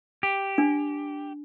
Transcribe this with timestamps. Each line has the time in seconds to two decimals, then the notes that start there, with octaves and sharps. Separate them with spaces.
0.23 G4
0.58 D4